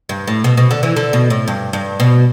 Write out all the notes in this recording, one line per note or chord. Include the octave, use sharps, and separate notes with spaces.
G2
A2
B2
B2
D3
E3
D3
B2
A2
G2
G2
B2